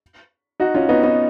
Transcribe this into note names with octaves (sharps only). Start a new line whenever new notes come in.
D#4 F#4
C#4 F4
B3 D#4
B3 D#4